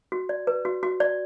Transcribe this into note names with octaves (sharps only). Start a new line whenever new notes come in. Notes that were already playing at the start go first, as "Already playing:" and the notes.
F#4
D5
B4
F#4
F#4
D5